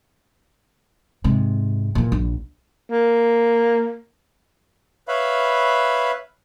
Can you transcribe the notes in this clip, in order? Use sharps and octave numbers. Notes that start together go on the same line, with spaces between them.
G#2 C3
A#2 E3
A#1
A#3
B4 C#5 E5 F5 B5